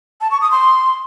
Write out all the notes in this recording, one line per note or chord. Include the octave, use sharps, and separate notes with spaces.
A5
C#6
D#6
C6